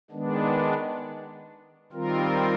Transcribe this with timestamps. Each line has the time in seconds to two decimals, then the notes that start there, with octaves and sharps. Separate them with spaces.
0.11 D#3 G#3 B3 D4
1.92 D#3 G3 C4 F4 A#4